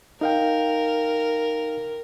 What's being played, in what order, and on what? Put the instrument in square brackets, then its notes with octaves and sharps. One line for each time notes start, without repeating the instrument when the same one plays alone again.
[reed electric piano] D#4 F5 G5 [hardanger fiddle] A#4